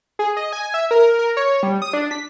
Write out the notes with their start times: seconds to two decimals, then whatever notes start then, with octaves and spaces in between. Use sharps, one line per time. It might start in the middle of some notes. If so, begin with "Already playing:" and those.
0.19 G#4
0.37 D#5
0.53 G#5
0.74 E5
0.91 A#4
1.19 A#4
1.37 C#5
1.63 G3
1.82 D#6
1.93 D4
2.11 B6